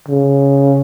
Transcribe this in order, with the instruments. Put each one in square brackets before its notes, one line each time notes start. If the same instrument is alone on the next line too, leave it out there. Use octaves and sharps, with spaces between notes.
[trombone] C#3